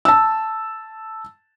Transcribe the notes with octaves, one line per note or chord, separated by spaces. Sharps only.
A5 E6